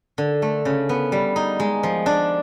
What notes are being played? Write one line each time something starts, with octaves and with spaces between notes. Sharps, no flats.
D3
A3
C#3
B3
G3
D#4
G#3
F3
D4